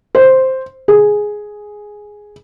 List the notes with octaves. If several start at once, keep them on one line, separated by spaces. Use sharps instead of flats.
C5
G#4